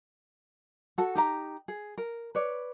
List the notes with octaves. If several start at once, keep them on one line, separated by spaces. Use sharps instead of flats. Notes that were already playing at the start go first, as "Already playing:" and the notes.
F#4 A4 A5
D#4 G4 A#5
G#4
A#4
B4 C#5 D5